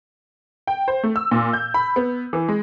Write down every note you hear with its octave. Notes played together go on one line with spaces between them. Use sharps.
G5
C5
A3
E6
A#2
G6
B5
B3
E3
G#3